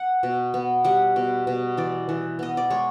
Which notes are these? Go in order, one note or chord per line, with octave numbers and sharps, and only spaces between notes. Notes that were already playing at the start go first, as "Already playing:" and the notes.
Already playing: F#5
B2
B3
G3 F#5
B2
B2
E3 D5
E3
B3 D#5
D5
G#3 C#5